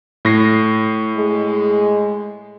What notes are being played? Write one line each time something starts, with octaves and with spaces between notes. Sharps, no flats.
A2 A#6 C7
G#3